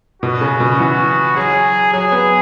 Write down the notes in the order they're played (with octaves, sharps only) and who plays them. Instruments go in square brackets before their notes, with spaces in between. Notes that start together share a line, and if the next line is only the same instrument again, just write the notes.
[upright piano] B2 [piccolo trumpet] F#4
[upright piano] C#3
B2
[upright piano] E3 [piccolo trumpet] F#4
[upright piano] F#3 [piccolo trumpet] G#4
[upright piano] F#3 [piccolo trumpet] G#4
[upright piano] B3